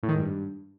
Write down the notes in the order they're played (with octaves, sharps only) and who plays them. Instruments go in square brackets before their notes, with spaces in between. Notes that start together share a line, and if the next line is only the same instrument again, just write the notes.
[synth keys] A2
D#3
G#2
G2